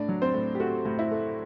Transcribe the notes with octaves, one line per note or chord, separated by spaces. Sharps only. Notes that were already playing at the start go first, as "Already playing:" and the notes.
Already playing: A2 D4 D5
F#3
C4 C5
A2
G4
A3 F#4
A2
E4
A3